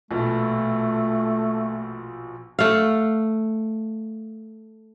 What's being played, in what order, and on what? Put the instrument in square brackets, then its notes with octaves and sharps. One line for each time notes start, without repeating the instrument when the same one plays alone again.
[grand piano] A#1 B2 [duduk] A3
[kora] A3 F5